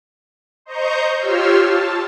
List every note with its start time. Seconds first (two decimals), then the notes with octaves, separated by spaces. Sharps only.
0.65 C5 D#5 A#5 C#6 G6
1.18 F4 G4 C#5 C6 E6 F6
1.60 A5